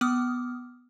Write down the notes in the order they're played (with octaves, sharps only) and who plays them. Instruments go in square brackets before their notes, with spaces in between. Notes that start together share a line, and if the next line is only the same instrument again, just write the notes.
[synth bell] B3 D6 D#6 F6